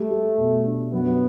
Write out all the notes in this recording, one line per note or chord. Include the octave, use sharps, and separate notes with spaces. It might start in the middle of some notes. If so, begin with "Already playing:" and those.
Already playing: G3 A3 G4
G3
B2
D4
F#2 B3